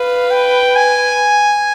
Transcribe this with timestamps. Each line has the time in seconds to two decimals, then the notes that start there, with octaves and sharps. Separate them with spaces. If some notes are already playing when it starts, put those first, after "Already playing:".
Already playing: B4 F5
0.31 G5
0.76 G#5